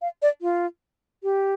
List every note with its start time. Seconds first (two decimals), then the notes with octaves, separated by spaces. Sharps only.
0.02 F5
0.22 D5
0.42 F4
1.23 G4